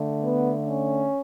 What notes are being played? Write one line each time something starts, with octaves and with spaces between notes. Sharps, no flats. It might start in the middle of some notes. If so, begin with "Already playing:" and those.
Already playing: D3 A3
B3
C#4